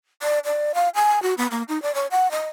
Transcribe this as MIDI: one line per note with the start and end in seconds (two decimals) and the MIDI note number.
0.22 0.39 74
0.45 0.72 74
0.74 0.89 77
0.95 1.22 80
1.22 1.34 66
1.38 1.47 59
1.51 1.63 58
1.69 1.81 63
1.82 1.94 74
1.94 2.07 73
2.11 2.30 78
2.31 2.48 75